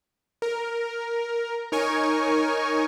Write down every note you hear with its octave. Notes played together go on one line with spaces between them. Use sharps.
A#4
D#4 A#4 C#5 G#5 C#6